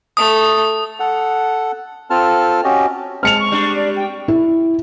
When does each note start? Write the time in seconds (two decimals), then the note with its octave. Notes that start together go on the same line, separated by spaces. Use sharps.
0.17 A3 D#6
1.00 A4 F#5
2.10 C4 F4 A4 A5 F6
2.64 C#4 F#4 G4 D#5
3.23 G#3 C4 A5 F6 C#7 F7
3.39 C#6
3.51 G3 D4
3.76 D5
3.96 G5
4.28 E4